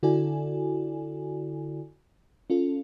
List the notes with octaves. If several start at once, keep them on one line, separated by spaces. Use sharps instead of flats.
D3 E4 F#4 A4 D5 G#5
C#4 F4 A4